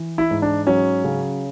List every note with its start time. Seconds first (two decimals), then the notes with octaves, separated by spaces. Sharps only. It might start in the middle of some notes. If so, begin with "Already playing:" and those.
Already playing: E3
0.18 E4
0.31 G#2
0.42 D4
0.67 F#3 C#4
1.04 C#3